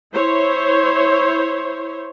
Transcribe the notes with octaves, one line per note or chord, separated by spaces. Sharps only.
E4 C5 C#5